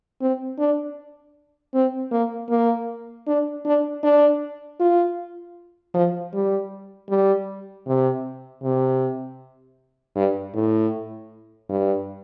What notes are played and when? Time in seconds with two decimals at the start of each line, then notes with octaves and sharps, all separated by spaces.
0.21 C4
0.58 D4
1.74 C4
2.12 A#3
2.49 A#3
3.27 D4
3.65 D4
4.03 D4
4.80 F4
5.94 F3
6.33 G3
7.09 G3
7.87 C3
8.63 C3
10.16 G2
10.54 A2
11.69 G2